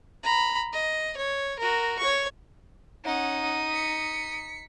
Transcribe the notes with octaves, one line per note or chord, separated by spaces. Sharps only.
A#5 B5
D#5
C#5
F#4 A#4
C#5 C#6
C#4 D#4 F#5 D#6
B6 C#7